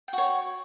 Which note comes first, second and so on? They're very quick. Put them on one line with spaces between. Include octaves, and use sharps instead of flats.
G5 F#4 C#5